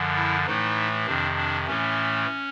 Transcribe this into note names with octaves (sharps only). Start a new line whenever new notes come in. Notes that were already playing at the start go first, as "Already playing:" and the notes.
Already playing: F#2 D3 F3
E4
A2 E3 A3 D#4
F2 C3 D#3 D4
D4
A2 E3 A3 C#4